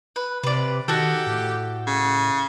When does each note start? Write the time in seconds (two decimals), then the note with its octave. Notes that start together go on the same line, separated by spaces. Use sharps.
0.16 B4
0.43 C3 B4 D5
0.88 D#3 F#4 G4 A4
1.27 A2
1.87 C#3